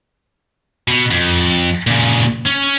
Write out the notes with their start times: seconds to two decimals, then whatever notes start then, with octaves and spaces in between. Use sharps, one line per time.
0.88 B2
1.11 F2
1.87 A#2 C#3
2.45 C#4